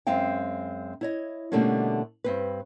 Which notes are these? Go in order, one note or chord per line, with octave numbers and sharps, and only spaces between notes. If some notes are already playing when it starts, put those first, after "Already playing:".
F#2 G#3 C4 F5 G5
E4 C#5 D#5
B2 D3 G3 A3 A#3 C#4
G2 C4 B4